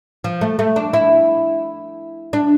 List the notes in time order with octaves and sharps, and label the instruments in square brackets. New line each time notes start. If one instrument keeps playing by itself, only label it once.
[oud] F3
A3
A3
D4
E4
D4